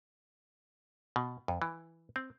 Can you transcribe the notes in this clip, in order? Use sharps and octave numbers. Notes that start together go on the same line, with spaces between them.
B2
F2
E3
C4